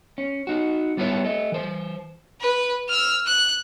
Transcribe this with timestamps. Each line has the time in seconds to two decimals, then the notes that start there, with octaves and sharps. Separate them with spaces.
0.18 C#4
0.47 D#4 F#4
0.97 G3 B3 E4 C5 C#5
1.25 A3 D#5
1.52 E3 C5
2.41 B4
2.89 E6 F6
3.26 F#6